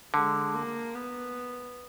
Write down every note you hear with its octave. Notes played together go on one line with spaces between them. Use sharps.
D3 G#3
A#3
B3